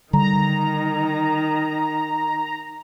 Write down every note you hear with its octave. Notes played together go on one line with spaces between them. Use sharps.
D3 D#3 G3 A#5